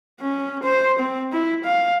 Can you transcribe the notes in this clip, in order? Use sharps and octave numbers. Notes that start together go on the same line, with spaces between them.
C#4
C5
C4
E4
F5